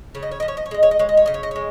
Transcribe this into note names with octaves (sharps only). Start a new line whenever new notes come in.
C#3 C#5
D#5
C#5
F3 D#5
C#5
D#5
C#5
G#3 D#5
C#5
D#5
G#3 C#5
D#5
C#5
C#3 D#5
C#5
D#5
G#3 C#5